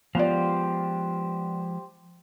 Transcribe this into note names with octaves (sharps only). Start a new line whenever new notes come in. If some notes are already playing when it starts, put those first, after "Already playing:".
F3 G#3 B3 F4 G4 C5 D5 F5